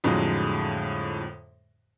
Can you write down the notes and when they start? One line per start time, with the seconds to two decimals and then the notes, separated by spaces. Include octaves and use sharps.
0.04 F2 A2 D3 F#3 G#3